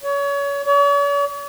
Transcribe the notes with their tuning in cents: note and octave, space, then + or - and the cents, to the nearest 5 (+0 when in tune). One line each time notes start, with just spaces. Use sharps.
C#5 +30
C#5 +45